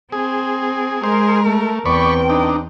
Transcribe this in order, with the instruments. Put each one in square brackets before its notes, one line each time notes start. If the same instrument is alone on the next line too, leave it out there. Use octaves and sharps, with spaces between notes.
[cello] C4 [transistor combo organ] G#4
[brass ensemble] G#3 [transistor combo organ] G#4 C5 [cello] A#4
[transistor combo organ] A3
[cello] E2 G5 [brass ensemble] C4 B4 [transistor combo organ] D5 B5 C#6
[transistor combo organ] D4 D#4